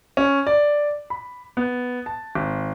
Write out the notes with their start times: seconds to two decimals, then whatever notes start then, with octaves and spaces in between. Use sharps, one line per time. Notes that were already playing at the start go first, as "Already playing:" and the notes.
0.17 C#4
0.47 D5
1.10 B5
1.57 B3
2.06 A5
2.35 G#1